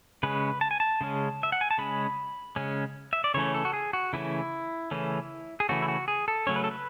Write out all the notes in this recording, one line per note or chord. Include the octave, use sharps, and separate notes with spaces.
C#3 G#3 C#4 B4
A5
G#5
A5
C#3 G#3 C#4
E5
F#5
G#5
A5
C#3 G#3 C#4 B5
C#3 G#3 C#4
E5
D5
C#3 E3 A3 C#4 C#5
A4
F#4
G#4
F#4
C#3 E3 A3 C#4 E4
C#3 E3 A3 C#4
G#4
C#3 E3 A3 C#4 F#4
E4
F#4
G#4
A4
C#3 F#3 A3 C#4 C#5
B4
A4
B4